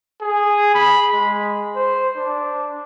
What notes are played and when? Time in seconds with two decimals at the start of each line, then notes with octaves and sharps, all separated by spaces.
0.21 G#4
0.74 B5
1.13 G#3
1.76 C5
2.16 D4